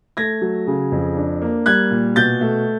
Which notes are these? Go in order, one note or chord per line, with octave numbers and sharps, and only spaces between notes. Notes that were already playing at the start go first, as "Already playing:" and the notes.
A3 G#6 A#6
F#3
C#3
F2
D4
A#3
G3 F#6 G#6
A#2
B2 G6 A6
A3